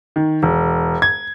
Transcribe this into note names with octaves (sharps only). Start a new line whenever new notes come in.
D#3
E1
G#6